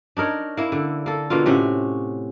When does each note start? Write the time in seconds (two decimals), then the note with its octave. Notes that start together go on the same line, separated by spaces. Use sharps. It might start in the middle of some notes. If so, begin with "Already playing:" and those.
0.17 D4 D#4 A#4 C#5
0.57 A#3 E4
0.72 D3
1.06 A#3 A4
1.30 B2 D3 A#3 F4
1.46 A2 C3 C#4 F#4